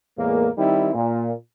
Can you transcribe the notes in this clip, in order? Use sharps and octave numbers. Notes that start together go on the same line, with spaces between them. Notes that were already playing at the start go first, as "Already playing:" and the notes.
E2 A2 G#3 A#3
D#3 G3 C4 D#4 E4
A#2